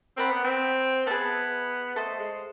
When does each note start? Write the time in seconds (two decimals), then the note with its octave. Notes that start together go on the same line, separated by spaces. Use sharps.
0.17 C4 A#4 D5 F#5 B5
0.30 B3
0.45 C4
1.06 B3 G#4 B4 E5 A5
1.96 A3 A4 C5 D#5
2.19 G#3